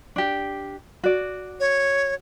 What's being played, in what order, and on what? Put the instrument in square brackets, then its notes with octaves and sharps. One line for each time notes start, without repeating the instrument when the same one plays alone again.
[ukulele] D4 G4
F#4 D5
[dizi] C#5